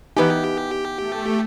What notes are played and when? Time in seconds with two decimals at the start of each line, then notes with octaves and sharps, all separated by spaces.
0.17 E3 B3 D#4 G4 B4 G#5
0.98 A3